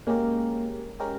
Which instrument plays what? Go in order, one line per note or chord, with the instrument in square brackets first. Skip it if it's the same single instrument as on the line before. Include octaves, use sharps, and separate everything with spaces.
[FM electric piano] G#3 C#4 G4 A#4 [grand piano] A#3
[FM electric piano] G#3 C#4 G4 A#4